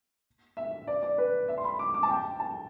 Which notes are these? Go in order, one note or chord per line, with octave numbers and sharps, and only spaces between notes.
E5
D5
D5
B4
E5
C6
B5
D6
D6
A5
G5
A5